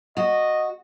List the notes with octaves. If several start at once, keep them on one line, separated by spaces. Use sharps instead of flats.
F#4 D#5